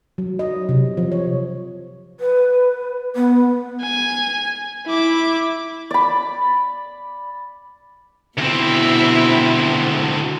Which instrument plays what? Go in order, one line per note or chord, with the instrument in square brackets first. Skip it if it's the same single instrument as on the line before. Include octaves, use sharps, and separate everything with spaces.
[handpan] F#3
D#5
C3
F3
C#5
[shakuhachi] B4
B3
[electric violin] G#5
E4 D6
[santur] D5 B5
[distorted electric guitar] D2 C4 [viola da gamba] B2 E4